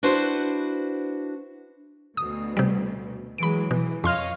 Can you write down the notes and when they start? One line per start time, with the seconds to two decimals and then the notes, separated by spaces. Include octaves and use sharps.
0.03 D4 E4 F#4 B4 C5
2.17 D2 B2 D#6
2.57 C3 G3
3.38 E3 F#3 G#3 B5 D7
3.71 B2 E3
4.04 F2 C#5 D#5 F5 C6 F6